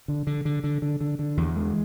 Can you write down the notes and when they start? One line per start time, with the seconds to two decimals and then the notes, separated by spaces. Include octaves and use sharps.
0.08 D3
0.27 D3
0.45 D3
0.64 D3
0.82 D3
1.01 D3
1.19 D3
1.37 E2
1.56 G#3